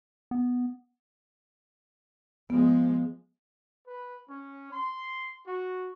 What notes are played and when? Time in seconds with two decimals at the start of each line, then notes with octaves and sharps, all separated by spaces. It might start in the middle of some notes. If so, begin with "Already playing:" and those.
0.31 B3
2.50 F3 G#3 B3
3.85 B4
4.29 C#4
4.72 C6
5.46 F#4